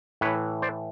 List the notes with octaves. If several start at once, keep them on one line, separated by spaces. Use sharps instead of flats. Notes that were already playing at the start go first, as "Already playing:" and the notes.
A2 E3 B4 C#5
C5 D5